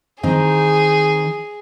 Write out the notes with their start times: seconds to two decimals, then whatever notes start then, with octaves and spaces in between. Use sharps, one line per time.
0.23 D#3 C4 D#4 G#4